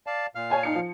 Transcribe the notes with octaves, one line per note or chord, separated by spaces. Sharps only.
D5 F5 A5
A#2 F5 F6
C#5 G#5 A5
D#4 C#7
F3